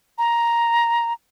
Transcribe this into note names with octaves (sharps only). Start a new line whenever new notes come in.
A#5